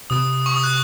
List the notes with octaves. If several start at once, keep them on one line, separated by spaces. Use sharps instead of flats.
C3 D#6
C#6
D#6
F#6